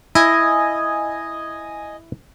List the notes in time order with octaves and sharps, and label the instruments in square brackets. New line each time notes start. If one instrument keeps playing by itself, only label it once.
[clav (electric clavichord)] E4 [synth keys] D#5 G#5